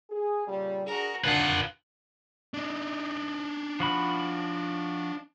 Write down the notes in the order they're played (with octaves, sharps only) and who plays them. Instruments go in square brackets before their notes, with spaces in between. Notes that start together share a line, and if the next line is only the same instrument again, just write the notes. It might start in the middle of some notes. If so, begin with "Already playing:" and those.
[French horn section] G#4
A#2 C#3 G3
[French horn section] D4 G#4 [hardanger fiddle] F#4 A#4
[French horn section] D#3 F#3 A#4 [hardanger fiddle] D4 F#5 [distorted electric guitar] F4 B4
[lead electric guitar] D4 D#4
[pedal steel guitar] F3 F#4 B5